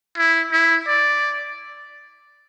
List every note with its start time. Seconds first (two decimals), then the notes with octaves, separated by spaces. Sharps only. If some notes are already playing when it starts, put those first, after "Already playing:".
0.18 E4
0.52 E4
0.88 D5